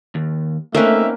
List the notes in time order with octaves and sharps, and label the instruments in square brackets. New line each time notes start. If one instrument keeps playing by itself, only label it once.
[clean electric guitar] D#2
[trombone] A3 [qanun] A#3 C#4 B4 [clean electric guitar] C4 D#4 [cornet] E5